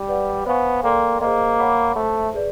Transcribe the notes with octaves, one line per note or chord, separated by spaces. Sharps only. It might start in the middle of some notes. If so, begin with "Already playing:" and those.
Already playing: G3
B4 D5 F#5
B3 C5 F5 G#5 C#6
A#3 A4 D5 G5 C6
A#3 G#4 C5 D#5
C#5 F#5 B5 D6
A3 A4 C5 E5 A5
G#4 B4 D5